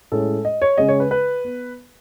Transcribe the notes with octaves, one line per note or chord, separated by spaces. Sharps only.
A2 G#3 C#4 A4
D#5
C#5
C#3 G#3 C#4 D#5
C#5
B4
B4
B3